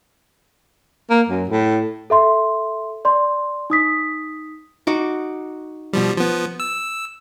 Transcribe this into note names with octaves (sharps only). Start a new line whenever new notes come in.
A#3
F#2
A2
A4 E5 C6
D5 C6
D#4 D#6 B6
D#4 F#4 D6
B2 F3 G3
F3 B3
E6